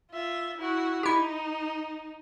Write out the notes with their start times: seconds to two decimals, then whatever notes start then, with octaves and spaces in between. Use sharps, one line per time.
0.12 F4 E5
0.58 E4 F#4
1.03 D#4 E4 G4